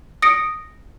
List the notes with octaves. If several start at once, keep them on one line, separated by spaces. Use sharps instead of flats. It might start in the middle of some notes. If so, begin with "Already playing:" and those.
D#6 A#6 C#7 D7